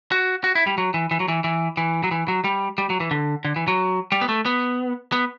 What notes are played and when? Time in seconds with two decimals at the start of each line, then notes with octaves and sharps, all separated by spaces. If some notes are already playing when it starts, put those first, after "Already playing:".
0.12 F#4
0.44 F#4
0.55 E4
0.67 G3
0.78 F#3
0.94 E3
1.11 E3
1.20 F#3
1.28 E3
1.44 E3
1.77 E3
2.04 F#3
2.11 E3
2.28 F#3
2.44 G3
2.78 G3
2.90 F#3
3.00 E3
3.11 D3
3.45 D3
3.56 E3
3.68 F#3
4.12 G3
4.21 B3
4.29 A3
4.46 B3
5.12 B3